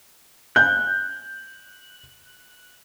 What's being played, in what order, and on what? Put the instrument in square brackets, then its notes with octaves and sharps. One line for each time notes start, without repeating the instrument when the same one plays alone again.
[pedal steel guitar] F#6 [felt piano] G6